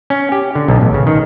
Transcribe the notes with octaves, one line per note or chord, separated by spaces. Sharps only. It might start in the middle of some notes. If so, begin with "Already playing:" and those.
C#4
G4
D3
B1
A1
C#3
D#3